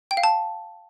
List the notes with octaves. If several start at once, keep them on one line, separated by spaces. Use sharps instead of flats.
G5
F5
A5